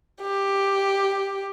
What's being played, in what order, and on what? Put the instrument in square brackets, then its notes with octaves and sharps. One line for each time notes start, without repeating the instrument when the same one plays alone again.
[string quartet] G4